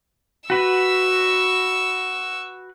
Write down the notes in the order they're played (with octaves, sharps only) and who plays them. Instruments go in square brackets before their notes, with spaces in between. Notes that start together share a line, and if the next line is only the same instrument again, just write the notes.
[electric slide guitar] F#4 B4 [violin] C#6 E6